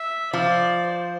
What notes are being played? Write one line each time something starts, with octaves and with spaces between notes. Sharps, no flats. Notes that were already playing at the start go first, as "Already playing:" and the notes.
Already playing: E5
F3 D5
C5